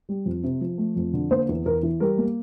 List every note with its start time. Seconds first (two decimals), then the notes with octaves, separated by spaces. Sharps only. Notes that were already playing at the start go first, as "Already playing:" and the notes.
0.09 G3
0.26 F2
0.44 C3
0.61 F3
0.78 A3
0.96 F2
1.13 D3
1.31 A#3 C5
1.49 E2
1.66 E2 A#4
1.83 E3
2.00 G3 A#4
2.18 A#3